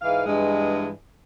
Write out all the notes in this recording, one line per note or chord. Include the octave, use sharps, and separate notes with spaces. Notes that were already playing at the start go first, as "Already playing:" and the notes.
G#2 E3 F5
G2 E3 G#3